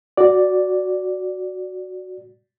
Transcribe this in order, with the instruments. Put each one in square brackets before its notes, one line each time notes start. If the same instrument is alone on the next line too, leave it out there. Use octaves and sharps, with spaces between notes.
[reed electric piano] F#4 D5